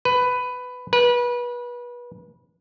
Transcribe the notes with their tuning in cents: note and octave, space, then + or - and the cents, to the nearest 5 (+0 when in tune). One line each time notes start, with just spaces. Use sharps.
B4 +10
B4 -30